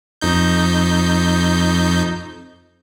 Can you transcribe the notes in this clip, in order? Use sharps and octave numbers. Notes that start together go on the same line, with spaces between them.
F2 D#4 G6